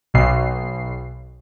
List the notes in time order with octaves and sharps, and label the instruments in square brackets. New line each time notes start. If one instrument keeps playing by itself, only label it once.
[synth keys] B1 B2 C7